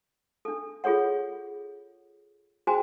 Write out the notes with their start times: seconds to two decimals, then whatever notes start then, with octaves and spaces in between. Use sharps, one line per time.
0.45 D4 A4
0.84 F4 G#4 A4 C#5 F#5
2.67 F#4 G#4 C5 G5 G#5 A#5